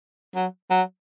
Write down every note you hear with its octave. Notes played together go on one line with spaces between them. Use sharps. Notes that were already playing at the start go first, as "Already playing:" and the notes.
F#3
F#3